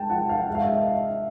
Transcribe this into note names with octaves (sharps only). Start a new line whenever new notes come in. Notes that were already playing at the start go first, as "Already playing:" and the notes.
Already playing: G#3 G5 A5
F3 F#5
F5
G#3 E5
F5
E5
D#5